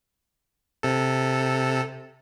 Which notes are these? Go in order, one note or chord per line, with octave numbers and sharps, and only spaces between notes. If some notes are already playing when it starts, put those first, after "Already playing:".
C3 A4